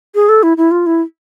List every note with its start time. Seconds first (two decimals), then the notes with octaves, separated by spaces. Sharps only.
0.15 G#4
0.29 A4
0.43 E4
0.57 E4
0.71 F4
0.86 E4